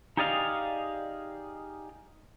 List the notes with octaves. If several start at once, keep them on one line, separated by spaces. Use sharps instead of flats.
D#4 G4 G#4 D5 D#5 F5